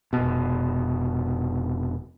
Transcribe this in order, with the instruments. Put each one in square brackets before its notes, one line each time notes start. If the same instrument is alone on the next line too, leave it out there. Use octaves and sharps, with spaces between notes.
[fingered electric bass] F1 B2